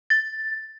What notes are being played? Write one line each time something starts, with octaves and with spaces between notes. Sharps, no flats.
A6